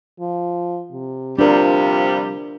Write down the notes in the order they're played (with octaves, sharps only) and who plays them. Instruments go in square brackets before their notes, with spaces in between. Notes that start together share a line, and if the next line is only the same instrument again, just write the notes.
[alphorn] F3
C3
[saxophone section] C3 F3 G3 [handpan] D4 A#4 [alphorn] F4